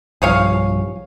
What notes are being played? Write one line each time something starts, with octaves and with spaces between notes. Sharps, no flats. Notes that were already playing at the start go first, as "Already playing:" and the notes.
B1 G2 F3 G#4 C#5 F5